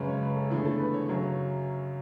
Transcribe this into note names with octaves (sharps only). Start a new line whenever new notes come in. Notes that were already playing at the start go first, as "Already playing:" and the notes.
Already playing: F#2 C#3 G#3 C#4 B4
C#5
B4
A4
E2 D3 A3 E4 G#4
A4
B4
C#5
F#2 C#3 F#3